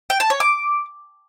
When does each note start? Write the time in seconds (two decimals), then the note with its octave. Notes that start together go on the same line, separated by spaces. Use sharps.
0.10 G5
0.20 A5
0.30 C#5
0.40 D6